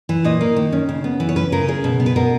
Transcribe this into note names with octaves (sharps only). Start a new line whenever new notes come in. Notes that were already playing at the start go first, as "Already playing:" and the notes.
E3
A#2 D#5
A#3
D#3
C#4
C#3
B3
E3
C#5
C#4 B4
C#3 A#4
C#4 G#4
B2
B3
B4
B2 A#4